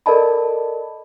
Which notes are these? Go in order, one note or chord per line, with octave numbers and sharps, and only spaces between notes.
A4 A#4 D5 D#5 A5 B5